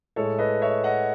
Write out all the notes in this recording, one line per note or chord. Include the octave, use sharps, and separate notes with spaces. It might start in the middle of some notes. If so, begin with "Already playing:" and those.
A2 G#3 A4 C#5
B4 D#5
C#5 E5
D#5 F#5